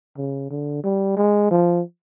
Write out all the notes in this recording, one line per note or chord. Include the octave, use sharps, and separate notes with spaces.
C#3
D3
G3
G#3
F3